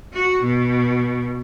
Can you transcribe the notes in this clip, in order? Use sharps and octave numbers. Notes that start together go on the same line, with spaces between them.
F#4
B2